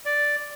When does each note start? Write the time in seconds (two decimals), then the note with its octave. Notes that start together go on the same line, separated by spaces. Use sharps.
0.05 D5